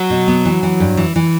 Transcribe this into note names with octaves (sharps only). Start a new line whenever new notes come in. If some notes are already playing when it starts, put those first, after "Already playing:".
Already playing: F#3
B2
B3
E3
E3
G2
E3
E3